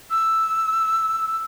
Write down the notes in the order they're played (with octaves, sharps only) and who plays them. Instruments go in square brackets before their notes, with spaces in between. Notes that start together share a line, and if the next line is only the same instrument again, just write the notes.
[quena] E6